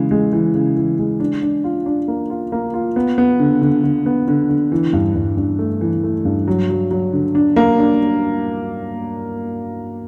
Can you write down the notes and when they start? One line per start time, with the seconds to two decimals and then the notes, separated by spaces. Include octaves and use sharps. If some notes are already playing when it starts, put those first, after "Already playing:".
Already playing: C#3 E3 G#3
0.11 G#3
0.33 E3
0.54 C#3
0.77 E3
0.99 G#3
1.20 D4
1.42 D4
1.64 F4
1.86 D4
2.08 A#3
2.30 F4
2.52 A#3
2.74 F4
2.96 B3
3.18 B3
3.39 D3
3.62 D3
3.84 D3
4.06 B3
4.28 D3
4.49 D3
4.72 E3
4.93 G2
5.15 G2
5.37 G2
5.59 A3
5.81 E3
6.03 A3
6.25 G2
6.47 F#3
6.69 F#3
6.91 F#3
7.13 D3
7.35 D4
7.56 A#3
7.78 D4